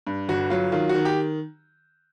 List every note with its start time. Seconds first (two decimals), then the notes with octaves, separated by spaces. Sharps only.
0.07 G2
0.29 G1 F#4
0.50 F#3 F4
0.72 D#3 F4
0.89 F#4
0.95 D#3
1.05 G4